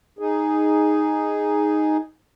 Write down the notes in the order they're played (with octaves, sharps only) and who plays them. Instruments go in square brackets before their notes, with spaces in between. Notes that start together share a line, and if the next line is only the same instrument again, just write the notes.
[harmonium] D#4 G#4